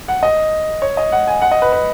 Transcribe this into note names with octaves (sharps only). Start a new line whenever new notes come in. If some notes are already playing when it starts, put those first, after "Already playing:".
F#5
D#5
C#5
D#5
F#5
G#5
F#5
D#5
B4
B4